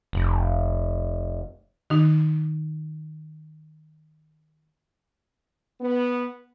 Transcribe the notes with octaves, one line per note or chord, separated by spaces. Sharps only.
F1
D#3 D#4
B3